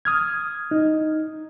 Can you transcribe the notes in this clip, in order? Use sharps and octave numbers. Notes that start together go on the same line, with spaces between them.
D#6 F6 G#6
D#4